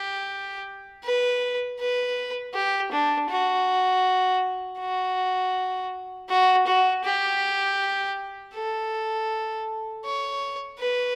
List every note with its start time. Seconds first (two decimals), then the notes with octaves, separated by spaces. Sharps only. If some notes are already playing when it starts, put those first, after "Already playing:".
Already playing: G4
1.04 B4
1.79 B4
2.54 G4
2.92 D4
3.30 F#4
4.80 F#4
6.29 F#4
6.67 F#4
7.05 G4
8.54 A4
10.05 C#5
10.80 B4